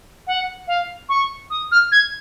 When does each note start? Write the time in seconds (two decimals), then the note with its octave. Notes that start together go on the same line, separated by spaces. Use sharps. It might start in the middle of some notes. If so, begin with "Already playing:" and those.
0.27 F#5
0.67 F5
1.09 C#6
1.50 D#6
1.71 F6
1.92 G#6